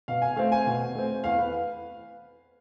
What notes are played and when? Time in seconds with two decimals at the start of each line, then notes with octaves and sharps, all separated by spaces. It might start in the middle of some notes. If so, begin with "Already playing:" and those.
0.08 B2 F5
0.22 G#5
0.36 A3 C4 F5
0.52 G#5
0.66 B2
0.95 A3 C4
1.24 E2 F5
1.39 B4